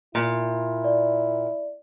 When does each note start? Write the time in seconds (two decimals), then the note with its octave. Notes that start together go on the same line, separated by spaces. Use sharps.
0.15 A#2 E4
0.84 D5